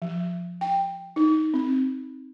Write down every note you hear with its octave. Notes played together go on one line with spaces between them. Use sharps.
F3
G5
D#4
C4